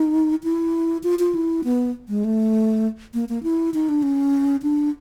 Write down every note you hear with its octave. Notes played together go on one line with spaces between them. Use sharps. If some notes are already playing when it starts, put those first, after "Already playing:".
Already playing: D#4
E4
F4
F4
E4
B3
G#3
A3
A#3
A#3
E4
D#4
D4
C#4
D4